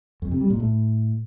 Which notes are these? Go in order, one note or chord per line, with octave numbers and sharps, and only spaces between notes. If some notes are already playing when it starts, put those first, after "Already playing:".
F2
C3
G3
A#2
A2